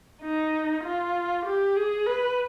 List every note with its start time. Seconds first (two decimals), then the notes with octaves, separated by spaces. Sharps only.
0.22 D#4
0.84 F4
1.45 G4
1.76 G#4
2.07 B4